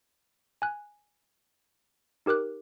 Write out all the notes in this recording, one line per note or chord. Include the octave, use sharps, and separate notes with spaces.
G#5 F#6
D#4 G4 A#4 D6 F#6